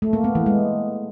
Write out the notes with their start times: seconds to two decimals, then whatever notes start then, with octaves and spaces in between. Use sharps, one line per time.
0.02 A3
0.13 A#3
0.24 B3
0.35 E3
0.46 G#3